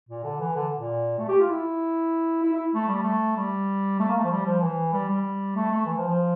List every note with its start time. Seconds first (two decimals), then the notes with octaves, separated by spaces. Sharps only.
0.09 A#2
0.24 D3
0.40 E3
0.56 D3
0.77 A#2
1.18 A3
1.28 G4
1.40 F4
1.50 E4
2.43 E4
2.54 E4
2.75 A3
2.88 G3
3.03 A3
3.37 G3
4.00 A3
4.09 A#3
4.18 A3
4.24 F3
4.31 G3
4.46 F3
4.62 E3
4.93 G3
5.09 G3
5.56 A3
5.72 A3
5.86 E3
5.97 F3
6.07 F3